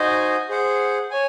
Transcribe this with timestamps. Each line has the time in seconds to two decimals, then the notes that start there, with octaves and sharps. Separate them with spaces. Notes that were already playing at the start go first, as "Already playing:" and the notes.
Already playing: D#4 F#4 C5 D#5 G#5
0.49 G#4 C5 F#5
1.11 C#5 G#5